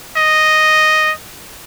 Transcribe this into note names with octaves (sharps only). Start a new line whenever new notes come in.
D#5